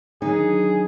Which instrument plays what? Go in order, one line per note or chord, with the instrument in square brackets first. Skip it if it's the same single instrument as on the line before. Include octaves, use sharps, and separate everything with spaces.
[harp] D#3 F#3 D4 [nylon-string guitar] D#4 [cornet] G#4